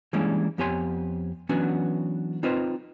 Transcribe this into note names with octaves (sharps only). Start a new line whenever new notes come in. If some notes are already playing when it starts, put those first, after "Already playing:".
E3 G3 G#3 A#3 C#4 D4
F2 B3 G4 C#5 G#5 C6
E3 F#3 B3 C#4 D4 F#4
C4 D#4 F4 B4 C5 D#5